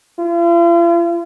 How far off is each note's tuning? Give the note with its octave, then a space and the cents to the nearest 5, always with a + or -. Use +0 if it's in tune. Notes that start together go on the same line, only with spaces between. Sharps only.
F4 -45